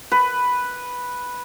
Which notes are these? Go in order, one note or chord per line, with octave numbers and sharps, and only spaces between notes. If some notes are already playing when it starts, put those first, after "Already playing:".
B4